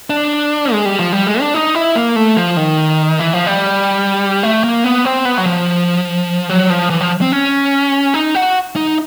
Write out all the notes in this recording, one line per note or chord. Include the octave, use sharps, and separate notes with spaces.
D4
G#3
G3
F3
G3
G#3
D4
D#4
E4
A#3
A3
F3
D#3
E3
F3
G3
A3
A#3
B3
C4
B3
F#3
F3
F#3
F3
E3
F3
C4
C#4
D#4
F#4
D#4